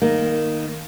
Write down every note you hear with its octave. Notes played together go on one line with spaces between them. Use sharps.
D#3 A#3